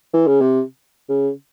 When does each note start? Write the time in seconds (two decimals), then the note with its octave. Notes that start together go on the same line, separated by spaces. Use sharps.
0.14 E3
0.27 C#3
0.41 C3
1.09 C#3